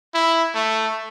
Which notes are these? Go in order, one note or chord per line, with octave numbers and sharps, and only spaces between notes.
E4
A3